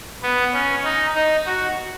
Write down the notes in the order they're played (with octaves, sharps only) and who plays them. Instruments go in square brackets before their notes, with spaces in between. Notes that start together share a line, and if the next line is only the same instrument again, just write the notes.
[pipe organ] B3
C#4
D#4
D#4
F#4